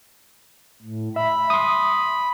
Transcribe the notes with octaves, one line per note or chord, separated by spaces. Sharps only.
A2
E5 B5
C6 D#6